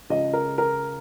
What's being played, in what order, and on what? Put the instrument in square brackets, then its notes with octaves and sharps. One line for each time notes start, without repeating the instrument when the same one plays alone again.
[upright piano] C#2 C#3 D#5
A#4
A#4